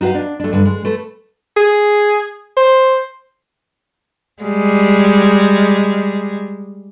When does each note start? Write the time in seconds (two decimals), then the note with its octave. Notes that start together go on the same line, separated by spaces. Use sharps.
0.01 D#4 F#4 G4 B4 F5
0.15 D4
0.40 A3 D4
0.53 G2 D3
0.65 G#3
0.85 A3 B4
1.57 G#4
2.57 C5
4.43 G3 G#3